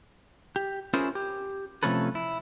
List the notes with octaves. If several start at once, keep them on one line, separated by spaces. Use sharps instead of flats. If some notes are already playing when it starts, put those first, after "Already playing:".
G4
C#4 E4 F4 G#4 A#4 C5
G4
C3 F3 A3 C#4 A4 B4
E4